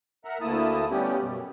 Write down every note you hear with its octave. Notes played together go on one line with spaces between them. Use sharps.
A#4 E5 F#5 A#5
D2 A3 A#3 E4 A5 D#6
G3 B3 C#4 G4
F#2 B2